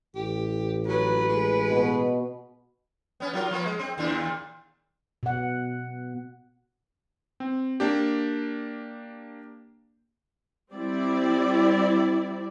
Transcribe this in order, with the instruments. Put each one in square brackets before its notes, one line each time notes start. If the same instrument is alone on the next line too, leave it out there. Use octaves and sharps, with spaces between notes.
[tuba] A1 [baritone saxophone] G4
[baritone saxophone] F#3 [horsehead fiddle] B4
[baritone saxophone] G#3
[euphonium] B2
[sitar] B3 C#4
F#3 F4 A#4
F3 A#3 B3
G#3
C4
D#2 A#2 D4
[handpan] B2 F#5
[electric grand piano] C4
A#3 D4 G4
[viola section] G3 C4 E4 D5